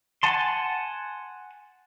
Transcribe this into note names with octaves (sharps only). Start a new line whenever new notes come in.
F#5 G#5 A5 C6